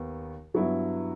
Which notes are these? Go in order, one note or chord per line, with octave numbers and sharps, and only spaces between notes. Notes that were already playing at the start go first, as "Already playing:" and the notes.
Already playing: D#2 D#3 B3
G2 F#3 B3 E4